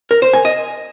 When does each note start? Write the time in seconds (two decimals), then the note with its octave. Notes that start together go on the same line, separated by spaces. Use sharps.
0.11 A#4
0.22 C5
0.33 G#5
0.45 D#5